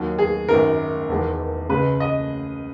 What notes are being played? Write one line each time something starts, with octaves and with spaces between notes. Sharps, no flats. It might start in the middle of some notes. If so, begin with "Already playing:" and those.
Already playing: D#2 D#3 F#3
G#4
G#1 F#2 D#3 A#4
E1 E2 D#3 G#3
C#2 C#3 G#3 B4
D#5